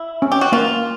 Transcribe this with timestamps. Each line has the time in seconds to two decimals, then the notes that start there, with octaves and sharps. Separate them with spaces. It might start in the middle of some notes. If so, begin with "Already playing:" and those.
Already playing: E4
0.22 C#4
0.32 G4
0.41 F#4
0.52 A#3 F4